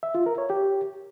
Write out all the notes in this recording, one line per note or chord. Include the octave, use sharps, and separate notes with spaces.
E5
F4
A#4
C#5
G4